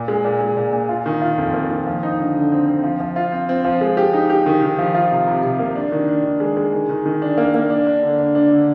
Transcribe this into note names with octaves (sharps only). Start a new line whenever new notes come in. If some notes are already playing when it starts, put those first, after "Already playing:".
Already playing: A#2
G#3
A#2
G#3
A#2
A#2
F4
D#3
F4
F2
A#3
D#3
F3
D#4
D3
D3
C4
C4
F3
F3
F4
C4
C4
F3
G#3
G4
D#4
G4
D#3
D#3
F3
F4
C3
C3
C3
A#3
D4
D#3
D4
D#3
G#3
G#3
D#3
D#3
D#3
D4
A#3
A#3
D4
D4
D3
D4
D4
D3